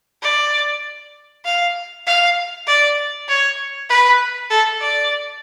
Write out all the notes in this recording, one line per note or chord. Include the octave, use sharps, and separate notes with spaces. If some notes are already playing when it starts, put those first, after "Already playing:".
D5
F5
F5
D5
C#5
B4
A4
D5